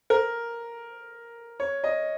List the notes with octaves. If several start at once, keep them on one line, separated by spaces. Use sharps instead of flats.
A#4
C#5
D#5